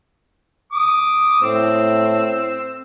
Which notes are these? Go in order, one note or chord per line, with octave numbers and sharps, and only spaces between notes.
D6 D#6
A2 C4 E6